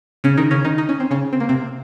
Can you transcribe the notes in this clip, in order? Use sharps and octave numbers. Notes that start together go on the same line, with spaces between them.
C#3 C#4
D#3 D#4
C#3 C#4
D#3 D#4
D#4
C#4
C4
C#3 C#4
C4
A#3
C3 C4